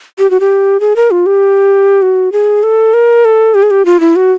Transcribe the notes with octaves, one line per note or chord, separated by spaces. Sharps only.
G4
F#4
G4
G#4
A#4
F4
G4
F#4
G#4
A4
A#4
A4
G4
G#4
G4
F4
E4
F#4